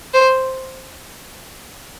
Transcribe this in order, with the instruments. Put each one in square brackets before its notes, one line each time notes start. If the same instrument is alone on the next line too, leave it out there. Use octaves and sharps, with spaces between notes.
[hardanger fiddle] C5